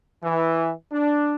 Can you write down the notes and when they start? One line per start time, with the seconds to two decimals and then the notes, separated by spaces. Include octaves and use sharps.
0.23 E3
0.92 D4